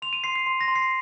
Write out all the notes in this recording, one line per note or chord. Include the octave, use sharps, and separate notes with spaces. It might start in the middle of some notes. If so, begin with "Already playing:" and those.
C6 F7
D#7
C6 C7
C7
C6
A#6
C6
C7